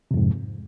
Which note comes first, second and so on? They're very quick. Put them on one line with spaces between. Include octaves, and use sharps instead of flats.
C3 F2 G#2